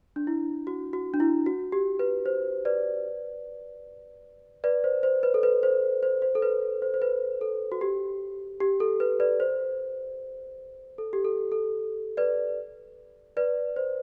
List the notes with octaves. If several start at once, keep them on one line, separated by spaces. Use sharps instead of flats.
D4
E4
F#4
F#4
D4
E4
F#4
G4
B4
C5
B4 D5
B4 D5
C5
C5
B4
A4
B4
C5
C5
C5
A4
B4
C5
C5
B4
A4
F#4
G4
G4
A4
B4
B4 D5
C5
A4
G4
A4
A4
B4 D5
B4 D5
C5